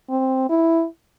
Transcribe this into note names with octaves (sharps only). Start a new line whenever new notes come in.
C4
E4